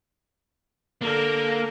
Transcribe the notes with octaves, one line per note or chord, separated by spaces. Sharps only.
D3 A#3 A#4